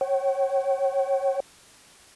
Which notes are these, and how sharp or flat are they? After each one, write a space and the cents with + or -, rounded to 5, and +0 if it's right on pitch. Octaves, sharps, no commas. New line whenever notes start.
C#5 -25 G5 -40